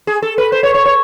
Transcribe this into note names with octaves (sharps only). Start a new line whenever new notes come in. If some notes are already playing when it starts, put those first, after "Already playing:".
G#4
A4
B4
C5
C#5
C#5
C#5